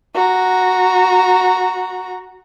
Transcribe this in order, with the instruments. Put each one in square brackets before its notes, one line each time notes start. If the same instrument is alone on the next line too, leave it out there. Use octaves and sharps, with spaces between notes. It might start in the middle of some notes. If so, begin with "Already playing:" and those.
[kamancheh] F#4 A#5